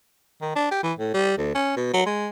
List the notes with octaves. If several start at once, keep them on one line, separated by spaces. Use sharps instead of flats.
D#3
D4
G4
E3
A2
G3
D2
C#4
B2
F#3
G#3